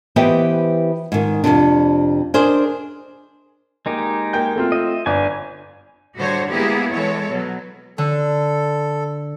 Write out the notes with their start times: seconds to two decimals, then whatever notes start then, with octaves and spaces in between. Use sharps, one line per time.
0.16 E3 B3 G4 C5 D#5 G5
1.12 G#2 D#3
1.44 F2 A2 C3 D4
2.34 D4 G#4 A#4 C5 D5 D#5
3.86 G#3 A#3 D#4 G4
4.33 A#3 G5 G6
4.56 A3 C4 F4
4.72 D#5 E5
5.06 G1 B4 D5 G#5
6.16 A2 D3 G3 F#4 C5 C#5
6.50 G#3 A#3 B3 E4 G4 G#4
6.93 E3 G#3 A4 C#5
7.29 B2 F#3
7.98 D3 A4